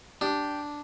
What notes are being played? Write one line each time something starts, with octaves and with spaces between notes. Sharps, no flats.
D4 G4